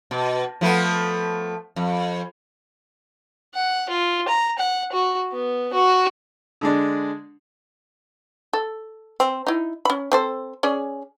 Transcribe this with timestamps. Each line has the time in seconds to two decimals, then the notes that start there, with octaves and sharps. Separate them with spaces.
0.11 B2
0.61 F3 A3 B3
1.76 F2
3.54 F#5
3.89 F4
4.28 A#5
4.59 F#5
4.92 F#4
5.33 B3
5.73 F#4
6.61 D3 G#3 D4
8.53 A4
9.20 C4
9.47 D#4 E4
9.85 C#4 B5
10.12 C4 A4 C5
10.63 C#4 G#4 D5